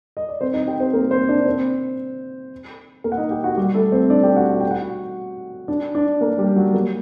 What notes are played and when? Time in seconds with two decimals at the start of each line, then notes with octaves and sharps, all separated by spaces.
0.17 D#5
0.29 D5
0.41 C4 C5
0.54 D#4 D#5
0.67 G4 G5
0.80 C4 C5
0.93 A#3 A#4
1.11 C4 C5
1.28 D4 D5
1.46 C4 C5
3.04 A#3 A#4
3.12 F#5
3.18 D#4 D#5
3.31 G4 G5
3.44 F#4 F#5
3.57 G3 G4
3.75 A3 A4
3.92 C4 C5
4.10 D4 D5
4.23 G4 G5
4.36 F#4 F#5
4.49 F#5
4.60 G5
4.71 F#4 F#5
5.68 D4 D5
5.95 D4 D5
6.21 A#3 A#4
6.38 G3 G4
6.56 F#3 F#4
6.74 A#3